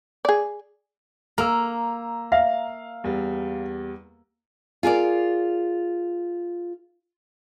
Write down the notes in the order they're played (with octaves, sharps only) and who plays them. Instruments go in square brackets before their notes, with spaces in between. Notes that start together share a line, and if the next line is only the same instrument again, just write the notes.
[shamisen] G#4 D5
[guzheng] A#3 [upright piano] A#5 E6
[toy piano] E5 [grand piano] F5
[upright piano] E2 G3
[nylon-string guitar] F4 G#4 A#4 D5